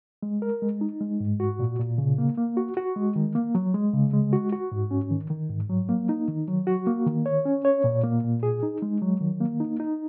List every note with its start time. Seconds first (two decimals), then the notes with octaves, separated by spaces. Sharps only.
0.23 G#3
0.42 A#4
0.62 G#3
0.81 D#4
1.01 G#3
1.20 G#2
1.40 F#4
1.60 A#2
1.79 A#2
1.98 C#3
2.18 A#3
2.37 A#3
2.57 F#4
2.77 F#4
2.96 G#3
3.16 D#3
3.35 A#3
3.55 F#3
3.74 G#3
3.94 C#3
4.13 G#3
4.33 F#4
4.52 F#4
4.72 G#2
4.91 C#4
5.11 D#3
5.30 D#3
5.50 G#2
5.69 F#3
5.89 A#3
6.09 D#4
6.28 D#3
6.48 F#3
6.67 F#4
6.87 A#3
7.06 D#3
7.26 C#5
7.45 C#4
7.65 C#5
7.84 A#2
8.04 A#3
8.24 A#2
8.43 G#4
8.63 D#4
8.82 G#3
9.02 F#3
9.21 D#3
9.41 A#3
9.60 D#4
9.80 D#4